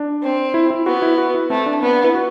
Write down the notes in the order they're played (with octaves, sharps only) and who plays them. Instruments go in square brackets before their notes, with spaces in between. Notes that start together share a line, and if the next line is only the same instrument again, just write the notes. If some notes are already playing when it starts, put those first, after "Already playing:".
Already playing: [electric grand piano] D4
[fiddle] C4
[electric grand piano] E4
E4
[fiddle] B3 [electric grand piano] F#4
[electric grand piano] E4
F#4
E4
[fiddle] A3 [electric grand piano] C4
[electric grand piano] D4
[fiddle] B3 [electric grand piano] C4
[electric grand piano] D4
E4
F#4